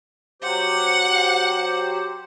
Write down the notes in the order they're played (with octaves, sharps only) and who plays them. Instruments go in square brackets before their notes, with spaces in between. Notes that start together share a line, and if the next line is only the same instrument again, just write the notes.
[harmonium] F#3 G4 C5 [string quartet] F#5